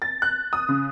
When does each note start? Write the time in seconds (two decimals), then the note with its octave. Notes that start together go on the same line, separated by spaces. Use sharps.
0.02 A6
0.22 F#6
0.53 D#6
0.69 C#3